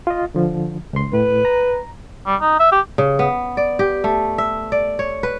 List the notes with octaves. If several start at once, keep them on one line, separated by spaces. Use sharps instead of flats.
F4 D#5
D3 F3
C#2 C6
A2 B4
A#5
G3
D#4
E5
G4
C#3
B3
D5
G4
A3
E5
D5
C#5
B4